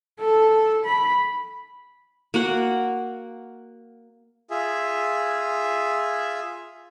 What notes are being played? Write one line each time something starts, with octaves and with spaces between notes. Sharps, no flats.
A4
B5
A#3 F#4 F#5
F4 G#4 E5